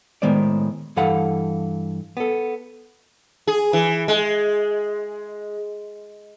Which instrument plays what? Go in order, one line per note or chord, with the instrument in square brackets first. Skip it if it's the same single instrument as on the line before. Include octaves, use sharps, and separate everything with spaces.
[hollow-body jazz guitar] A2 D#3 G#3 B3 C5 D5
G2 E3 A4 F5 F#5 B5
B3 A4
[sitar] G#4
E3
G#3